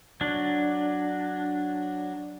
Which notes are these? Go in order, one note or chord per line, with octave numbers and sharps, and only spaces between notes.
F#3 D4